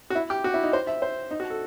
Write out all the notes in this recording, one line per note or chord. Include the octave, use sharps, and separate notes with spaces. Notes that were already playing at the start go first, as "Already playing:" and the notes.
F#4
E4
G4
F#4
E4
D#4
C5
E5
C5
D#4
F#4
A4